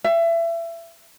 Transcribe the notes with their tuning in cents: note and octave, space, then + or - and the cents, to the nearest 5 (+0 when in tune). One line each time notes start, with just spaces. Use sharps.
E5 +25